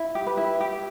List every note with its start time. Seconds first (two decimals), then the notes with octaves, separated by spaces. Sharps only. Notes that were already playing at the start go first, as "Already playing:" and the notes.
Already playing: E4
0.15 G4
0.27 B4
0.37 E4
0.61 G4